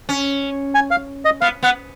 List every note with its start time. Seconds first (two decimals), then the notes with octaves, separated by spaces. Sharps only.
0.09 C#4
0.75 G#5
0.91 F5
1.25 D#5
1.41 B3 F5
1.63 B3 F#5